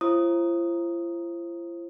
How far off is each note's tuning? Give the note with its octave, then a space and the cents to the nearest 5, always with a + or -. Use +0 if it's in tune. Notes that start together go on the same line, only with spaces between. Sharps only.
F4 -45 C5 +25 D#6 +0